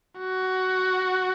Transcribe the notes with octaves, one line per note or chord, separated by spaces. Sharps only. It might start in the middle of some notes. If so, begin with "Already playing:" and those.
F#4